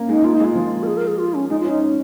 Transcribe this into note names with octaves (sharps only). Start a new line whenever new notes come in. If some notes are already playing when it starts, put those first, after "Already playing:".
Already playing: A#3 C#4
G#3 D#4
A#3 F4
D#4
G#3 F4
F3
A#4
G#4
A#4
G#4
F4
C#4
G#3 D#4
F4
C#4
D#4
C#4